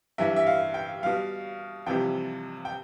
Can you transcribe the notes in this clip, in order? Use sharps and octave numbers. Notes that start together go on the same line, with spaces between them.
G2 E3 G3 E5
E5
F5
G5
B2 G3 F5
F2 C3 E3 G3 G5
G5